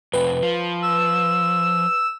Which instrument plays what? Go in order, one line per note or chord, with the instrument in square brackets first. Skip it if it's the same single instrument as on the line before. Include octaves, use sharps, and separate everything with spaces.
[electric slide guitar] F2 C3 [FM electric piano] B4
[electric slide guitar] F3
[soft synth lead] E6